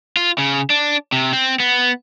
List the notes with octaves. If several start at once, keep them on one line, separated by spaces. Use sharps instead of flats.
F4
C#3
D4
C3
C4
B3